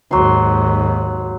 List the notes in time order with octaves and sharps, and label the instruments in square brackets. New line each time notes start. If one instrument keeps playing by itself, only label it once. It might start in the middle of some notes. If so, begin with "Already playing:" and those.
[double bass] D#2 G#2 [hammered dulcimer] F#3 C6